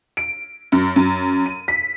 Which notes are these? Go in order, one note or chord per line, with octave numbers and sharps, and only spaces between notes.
D7
F#2
F#2
D#7
B6